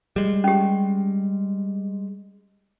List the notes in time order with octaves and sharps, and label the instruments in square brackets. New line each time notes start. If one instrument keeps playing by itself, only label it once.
[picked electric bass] G3 G#3
[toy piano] C#4 G4